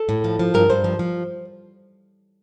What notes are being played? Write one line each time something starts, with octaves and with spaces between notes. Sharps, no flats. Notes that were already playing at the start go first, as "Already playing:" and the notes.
Already playing: A4
A2
F3
F3
G2 A#4
G2 C5
F3
F3